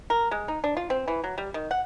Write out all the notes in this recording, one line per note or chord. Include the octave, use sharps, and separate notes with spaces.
A#4
G#3
D#4
D4
F4
C4
E3
F#3
G3
D#3
F#5